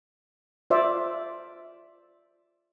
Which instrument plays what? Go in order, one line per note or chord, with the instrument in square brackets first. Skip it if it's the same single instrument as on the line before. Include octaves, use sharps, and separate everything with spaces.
[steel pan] F4 C5 D5 E5